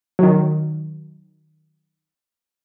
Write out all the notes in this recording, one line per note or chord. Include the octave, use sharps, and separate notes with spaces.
D#3 F#3